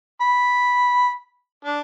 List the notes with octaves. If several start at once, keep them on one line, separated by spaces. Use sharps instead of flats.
B5
D4